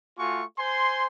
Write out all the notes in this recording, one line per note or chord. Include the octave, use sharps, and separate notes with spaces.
A3 F4 F#4 G#5 C#6
C5 G#5 C6